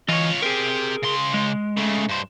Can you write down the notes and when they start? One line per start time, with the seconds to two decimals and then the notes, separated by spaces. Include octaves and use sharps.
0.09 E3 F4 C#5 D#5
0.42 C4 G4 G#4 A#4
1.03 C#3 C6
1.34 G#3
1.77 C#3 A3
2.09 G2 C5